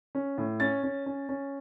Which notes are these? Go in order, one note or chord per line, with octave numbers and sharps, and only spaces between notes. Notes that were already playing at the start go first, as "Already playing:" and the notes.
C#4
A2
C#4 A6
C#4
C#4
C#4